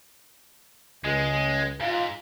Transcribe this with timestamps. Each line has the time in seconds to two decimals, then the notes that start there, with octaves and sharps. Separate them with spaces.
1.05 C#2 G#3
1.80 G#2 F4